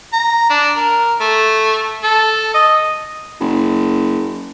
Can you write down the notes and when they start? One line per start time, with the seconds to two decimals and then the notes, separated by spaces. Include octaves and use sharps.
0.13 A#5
0.50 D4
0.77 A#4
1.21 A3
2.04 A4
2.54 D#5
3.41 F#1